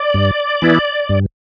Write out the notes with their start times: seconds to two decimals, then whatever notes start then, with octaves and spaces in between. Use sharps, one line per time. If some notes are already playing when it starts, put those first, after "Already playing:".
Already playing: D5
0.14 G2
0.62 E3 B3 E4
1.09 G2